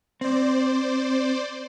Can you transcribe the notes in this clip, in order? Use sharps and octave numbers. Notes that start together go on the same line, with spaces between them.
C4 C5 D5